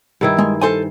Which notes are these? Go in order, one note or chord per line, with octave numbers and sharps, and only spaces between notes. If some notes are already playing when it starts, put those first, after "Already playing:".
G2 D#3 E4
G#3
A4 C5 G#5